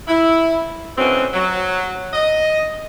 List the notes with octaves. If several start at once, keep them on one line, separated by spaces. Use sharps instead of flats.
E4
D2 B2 E3 F#3 C4 C#4
F#3
D#5